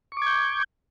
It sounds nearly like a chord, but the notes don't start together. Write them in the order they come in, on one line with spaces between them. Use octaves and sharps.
C#6 D6 G#6 G6